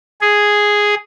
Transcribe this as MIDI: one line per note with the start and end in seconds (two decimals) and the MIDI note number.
0.21 0.95 68